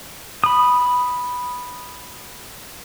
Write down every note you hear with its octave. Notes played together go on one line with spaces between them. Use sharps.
B5 D#6